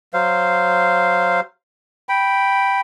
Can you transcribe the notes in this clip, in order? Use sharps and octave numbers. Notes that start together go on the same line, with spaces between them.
F#3 C5 F5
G5 B5